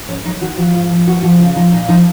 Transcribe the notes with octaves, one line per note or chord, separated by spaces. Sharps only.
G#2 C#4
F#3 D#4
D#3 F#4
F3 F#4
G#2 F4
F3
D#2 F#4
F3 F#4
C#3 F4
F3 D#4
A#2 D#4
F3 D#4